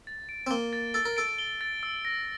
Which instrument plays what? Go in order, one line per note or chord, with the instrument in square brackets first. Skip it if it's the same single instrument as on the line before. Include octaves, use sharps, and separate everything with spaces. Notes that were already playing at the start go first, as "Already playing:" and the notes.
[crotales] A6
D7
[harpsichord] C4
[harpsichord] A#3 [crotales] G7
[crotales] A6
[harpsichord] A4 [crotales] A6
[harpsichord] A#4
[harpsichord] A4 [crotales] D7
[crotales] G7
A6
E6
A#6